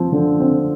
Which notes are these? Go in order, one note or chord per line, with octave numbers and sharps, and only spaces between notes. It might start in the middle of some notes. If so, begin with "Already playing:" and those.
Already playing: F3 C4
D3
C4